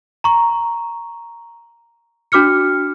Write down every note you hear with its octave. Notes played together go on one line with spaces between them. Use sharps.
A#5 C#6
D4 F#4 D6 F6 C#7